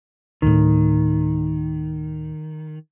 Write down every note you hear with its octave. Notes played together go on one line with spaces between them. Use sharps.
D1 A2 D#3